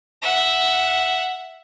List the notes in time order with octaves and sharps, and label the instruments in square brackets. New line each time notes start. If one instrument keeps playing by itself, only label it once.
[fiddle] E5 F#5